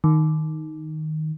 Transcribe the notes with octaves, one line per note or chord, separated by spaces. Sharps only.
D#3